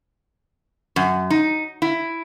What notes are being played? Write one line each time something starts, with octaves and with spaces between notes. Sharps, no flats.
F#2
D#4
E4